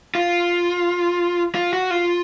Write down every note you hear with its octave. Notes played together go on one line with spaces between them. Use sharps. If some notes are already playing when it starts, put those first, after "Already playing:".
F4
F4
F#4
F4